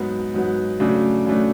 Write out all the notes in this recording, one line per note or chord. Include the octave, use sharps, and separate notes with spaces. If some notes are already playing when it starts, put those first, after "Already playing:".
Already playing: G#2 F#3 B3
G#2 F#3 B3
C#3 F#3 A3 D4
C#3 F#3 A3 D4